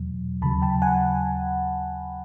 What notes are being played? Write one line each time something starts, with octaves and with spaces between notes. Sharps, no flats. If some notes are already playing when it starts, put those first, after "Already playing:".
Already playing: E2 B2 F#3
D#2 C#3 F#3 A5 B5
G5 A5
F#5 G#5